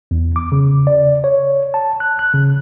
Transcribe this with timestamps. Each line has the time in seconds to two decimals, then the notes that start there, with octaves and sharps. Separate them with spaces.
0.11 E2
0.36 D6
0.52 C#3
0.87 D5
1.24 C#5
1.74 A5
2.00 F#6
2.19 F#6
2.34 C#3